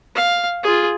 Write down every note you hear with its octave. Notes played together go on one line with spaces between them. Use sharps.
F5
F4 G#4